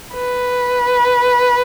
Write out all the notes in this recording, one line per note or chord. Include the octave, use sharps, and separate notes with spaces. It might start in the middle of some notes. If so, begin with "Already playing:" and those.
B4